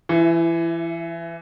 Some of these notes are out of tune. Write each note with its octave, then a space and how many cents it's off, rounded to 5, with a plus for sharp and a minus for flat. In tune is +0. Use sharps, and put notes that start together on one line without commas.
E3 +25 E4 +0